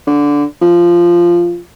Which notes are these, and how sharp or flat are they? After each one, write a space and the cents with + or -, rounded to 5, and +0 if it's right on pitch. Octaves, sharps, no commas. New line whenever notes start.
D3 -15
F3 -10